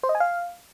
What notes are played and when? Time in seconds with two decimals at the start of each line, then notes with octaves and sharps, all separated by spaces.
0.03 C5
0.09 D#5
0.15 G#5
0.20 F5